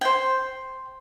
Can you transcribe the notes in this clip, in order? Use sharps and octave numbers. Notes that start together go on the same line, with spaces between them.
C5 G5